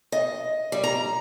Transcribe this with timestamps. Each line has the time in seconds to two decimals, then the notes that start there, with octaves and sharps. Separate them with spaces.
0.12 D#5
0.72 G3
0.84 A#5